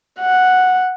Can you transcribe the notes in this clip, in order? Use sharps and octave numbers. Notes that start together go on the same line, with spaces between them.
F#5